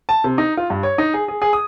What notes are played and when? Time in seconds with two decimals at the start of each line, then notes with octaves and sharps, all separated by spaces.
0.09 A5
0.24 C3
0.38 D#4
0.57 F4
0.70 G2
0.83 C#5
0.98 D#4
1.14 G#4
1.28 G#4
1.42 G#4
1.53 D#6